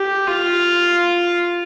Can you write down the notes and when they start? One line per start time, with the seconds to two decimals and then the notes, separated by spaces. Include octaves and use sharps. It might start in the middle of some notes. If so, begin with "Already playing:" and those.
Already playing: G4
0.26 F4